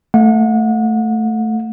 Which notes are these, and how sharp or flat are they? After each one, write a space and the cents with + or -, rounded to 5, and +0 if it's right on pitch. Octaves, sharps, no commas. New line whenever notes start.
A3 +0 F#5 -35